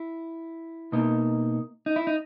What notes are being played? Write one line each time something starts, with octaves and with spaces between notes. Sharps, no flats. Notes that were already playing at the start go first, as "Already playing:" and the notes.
Already playing: E4
B2 A#3 D#4
D#4
E4
D#4